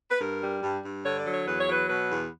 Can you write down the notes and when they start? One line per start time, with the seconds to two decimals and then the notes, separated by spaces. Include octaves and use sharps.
0.10 B4
0.20 G2 A#4
0.42 G3
0.62 G2
0.83 G2
1.05 D3 C#5
1.18 D5
1.26 F#3
1.32 C#5
1.47 E2 B4
1.59 C#5
1.68 F#3 B4
1.89 B2 B4
2.10 E2